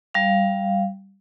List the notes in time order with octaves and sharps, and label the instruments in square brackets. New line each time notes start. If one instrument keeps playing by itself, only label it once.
[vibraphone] G3 F5